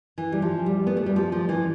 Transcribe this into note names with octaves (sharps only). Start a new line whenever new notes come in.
E3
G3
F3
G3
B3
A3
G3
F3
F3
E3